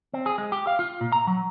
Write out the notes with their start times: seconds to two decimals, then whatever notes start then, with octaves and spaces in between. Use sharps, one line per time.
0.14 C4
0.26 G#4
0.38 G#3
0.52 G4
0.67 F5
0.79 F4
1.01 A#2
1.12 A#5
1.27 F#3